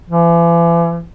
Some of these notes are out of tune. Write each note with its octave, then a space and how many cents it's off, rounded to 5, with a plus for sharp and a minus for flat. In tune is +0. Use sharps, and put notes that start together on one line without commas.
E3 +40